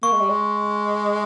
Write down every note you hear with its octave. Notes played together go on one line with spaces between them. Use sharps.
A#3 C#6
G#3
G3
G#3